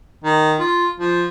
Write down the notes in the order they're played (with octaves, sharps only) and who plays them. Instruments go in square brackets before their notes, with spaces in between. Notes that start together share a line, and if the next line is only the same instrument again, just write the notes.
[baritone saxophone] D#3
F4
F3